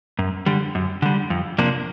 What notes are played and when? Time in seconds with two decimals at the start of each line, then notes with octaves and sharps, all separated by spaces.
0.19 F#2
0.46 D3 G3
0.75 F#2
1.02 D3 G3
1.30 F2
1.58 C3 F3 A#3 D4